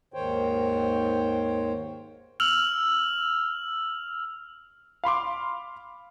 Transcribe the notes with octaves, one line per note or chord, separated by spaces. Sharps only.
D#2 G#2 D#3 C5 C#5 G5
E6 F6 F7 F#7
F5 B5 C6 D6